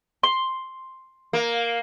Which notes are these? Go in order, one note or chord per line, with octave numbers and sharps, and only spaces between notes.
C6
A#3